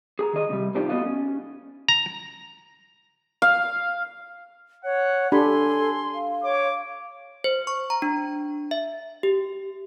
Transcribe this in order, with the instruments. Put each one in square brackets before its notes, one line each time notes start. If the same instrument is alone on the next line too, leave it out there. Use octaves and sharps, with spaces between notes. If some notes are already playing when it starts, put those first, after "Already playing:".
[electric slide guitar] G#4 G#5 A#5
D#3 G#4 D#5
A2 C3 G3
C4 D4 D#4 F4 G4
A3 B3 F#4 A4 D#5 F5
C#4
[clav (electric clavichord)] A#5
[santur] F5
[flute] C#5 [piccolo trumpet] F#5
[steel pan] D4 G4 B5 [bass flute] A4 [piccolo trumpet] G#5 [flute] C6
[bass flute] F5
[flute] C#5 [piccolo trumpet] D6
[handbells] C5
C#6
A#5
D4
E5
G4